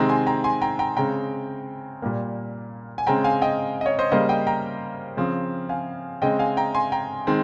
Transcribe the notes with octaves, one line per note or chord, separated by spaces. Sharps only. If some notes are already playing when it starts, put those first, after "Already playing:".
Already playing: C3 D#3 G#3 C4 G5 A#5
G#5 C6
G5 A#5
G#5 C6
G5 A#5
G5 A#5
C#3 G#3 C4 G5 A#5
A#2 G3 A#3
G#5
C#3 G#3 C4 G5 A#5
F5 G#5
D#5 G5
D#5
C#5
C5 D#5
C#3 G3 A#3 C5 D#5
D#5 G5
G5 A#5
C#3 F3 C4
F5 G#5
C#3 G#3 C4 D#5 G5
F5 G#5
G5 A#5
G#5 C6
G5 A#5
D#3 G#3 C4